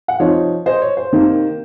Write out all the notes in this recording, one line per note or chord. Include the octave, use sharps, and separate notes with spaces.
F#5
C3 F3 C4 D#4 C#5 F5
C5 D#5
C#5
C5
C3 D#3 A#3